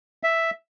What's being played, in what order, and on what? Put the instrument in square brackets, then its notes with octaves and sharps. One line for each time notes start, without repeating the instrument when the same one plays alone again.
[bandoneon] E5